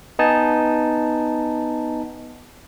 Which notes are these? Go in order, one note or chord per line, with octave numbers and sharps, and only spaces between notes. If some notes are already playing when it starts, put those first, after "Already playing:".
B3 D#4 G#5 A5